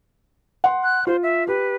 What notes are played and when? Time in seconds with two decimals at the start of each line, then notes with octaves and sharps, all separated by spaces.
0.64 F#5 C6
0.83 F#6
1.07 F4 C5
1.23 E5
1.48 G4 B4